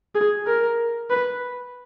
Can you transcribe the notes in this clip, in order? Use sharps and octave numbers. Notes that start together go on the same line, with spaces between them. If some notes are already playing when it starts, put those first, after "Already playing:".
G#4
A#4
B4